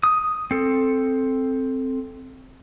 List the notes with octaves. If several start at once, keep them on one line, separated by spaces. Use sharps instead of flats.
D#6
C4 A4